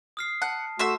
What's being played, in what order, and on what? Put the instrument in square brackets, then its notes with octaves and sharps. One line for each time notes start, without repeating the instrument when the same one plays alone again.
[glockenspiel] D#6 F6 C7
[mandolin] F#5 [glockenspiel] A5
[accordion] A3 F#4 [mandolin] C5 E5 E6